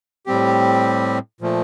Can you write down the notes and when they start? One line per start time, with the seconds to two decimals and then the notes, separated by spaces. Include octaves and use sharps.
0.26 A2 G3 C4 G4
1.41 A#2 F3 A3